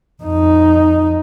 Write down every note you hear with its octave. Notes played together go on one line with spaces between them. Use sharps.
F2 D#4